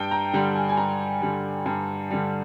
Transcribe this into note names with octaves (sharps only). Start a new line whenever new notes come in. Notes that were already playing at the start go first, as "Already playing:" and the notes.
Already playing: G2 G5
A#5
D3 G3 A#5
G#5
G#5
G2 A#5
D3 G3
G2
D3 G3